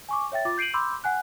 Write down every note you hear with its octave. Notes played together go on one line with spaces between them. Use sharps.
G#5 C#6 D6
C#5 E5 G5 A6
F4 D6 A6
G6 C7 D7 D#7 F#7
B5 C6 D6 E6 G6
F#5 G#5 F#6